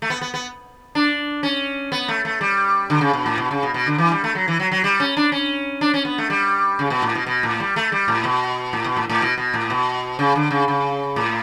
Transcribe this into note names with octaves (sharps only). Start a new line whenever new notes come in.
A3
B3
B3
B3
D4
C#4
B3
A3
A3
G3
D3
C#3
B2
A2
B2
C#3
B2
B2
D3
E3
G3
A3
F#3
E3
F#3
F#3
G3
C#4
D4
C#4
D4
C#4
B3
A3
G3
C#3
B2
A2
B2
B2
A2
G3
A3
G3
A2
B2
A2
B2
A2
A2
B2
B2
A2
B2
C#3
D3
C#3
C#3
A2